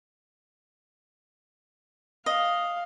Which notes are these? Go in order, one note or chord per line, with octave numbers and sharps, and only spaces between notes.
D#5 F5